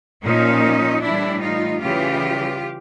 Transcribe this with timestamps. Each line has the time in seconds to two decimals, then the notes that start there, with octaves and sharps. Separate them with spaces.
0.23 A#2 F3 C#4 D#4
1.01 A2 E3 G3 D4 E4
1.40 D#4 F4
1.80 C#3 E3 G3 F4 G4